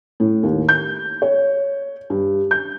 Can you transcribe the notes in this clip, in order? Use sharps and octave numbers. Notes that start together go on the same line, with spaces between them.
A2
D#2
G6
C#5
G2
G6